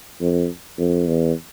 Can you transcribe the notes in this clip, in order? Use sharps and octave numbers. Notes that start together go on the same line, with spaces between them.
F2
F2
E2